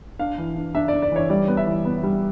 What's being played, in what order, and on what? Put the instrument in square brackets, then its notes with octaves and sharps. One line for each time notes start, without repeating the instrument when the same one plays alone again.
[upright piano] D4 F5
E3
D4
D4 E5
D5
D4
D5
E3 C#5
G3 D5
B3
E5
E3
B3
G3